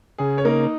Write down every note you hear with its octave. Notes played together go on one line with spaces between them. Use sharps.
C#3 G#4
C#5
A#3 D#4 A#4